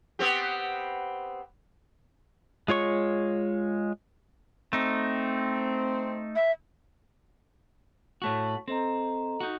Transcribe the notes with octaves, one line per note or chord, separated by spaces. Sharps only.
B3 C4 G4
G#3 F4 C#5 C#6
A3 C4 D#4
E5
A2 A3 F#4 C#5 A5 C#6
C4 A4 D#5 A#5
D#4 F#4